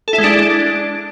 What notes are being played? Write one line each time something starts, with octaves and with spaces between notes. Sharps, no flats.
A4
E4
G#3
D4